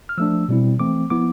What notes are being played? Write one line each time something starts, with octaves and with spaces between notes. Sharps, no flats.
F6
F3 A3 D4 E6
B2 G3 C4 E4
E3 A3 C4 D6
F3 B3 E4 D6